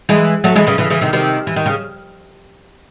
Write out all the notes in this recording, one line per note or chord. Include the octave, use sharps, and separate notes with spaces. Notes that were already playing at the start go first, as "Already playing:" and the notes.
E3 G#3
F#3 A3
E3 G#3
C#3 E3
C#3 E3
C#3 E3
C3 D#3
C3 D#3
E3
D#3
C#3